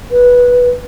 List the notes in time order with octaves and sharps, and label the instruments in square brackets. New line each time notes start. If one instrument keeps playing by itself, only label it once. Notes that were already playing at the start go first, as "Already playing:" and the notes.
[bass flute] B4